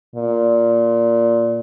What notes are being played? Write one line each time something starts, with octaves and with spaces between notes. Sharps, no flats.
A#2